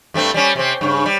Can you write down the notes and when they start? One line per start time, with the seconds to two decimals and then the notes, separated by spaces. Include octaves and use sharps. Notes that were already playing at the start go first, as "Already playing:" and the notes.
0.14 G2 A3 C4
0.34 G3 C#4
0.56 C3 C4
0.81 G2 C#3
1.06 G3